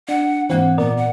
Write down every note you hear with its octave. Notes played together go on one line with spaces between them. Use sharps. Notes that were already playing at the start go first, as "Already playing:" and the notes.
D4 F#5
G#2 E3 A#3 C4 F#5
A#2 B3 A#4 D5
F#5